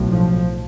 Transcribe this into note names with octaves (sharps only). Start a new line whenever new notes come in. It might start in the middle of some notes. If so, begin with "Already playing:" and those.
Already playing: B1 A2
F3